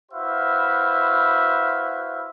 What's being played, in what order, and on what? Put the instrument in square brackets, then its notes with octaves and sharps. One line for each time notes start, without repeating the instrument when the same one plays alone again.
[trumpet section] E4 F#4 B4 C5 E5 F5